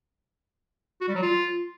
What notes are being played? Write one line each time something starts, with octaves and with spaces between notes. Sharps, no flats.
F#4
G3
F#3
F4